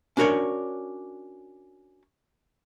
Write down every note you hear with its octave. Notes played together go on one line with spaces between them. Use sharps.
C#4 D4 F#4 A#4 C#5 D5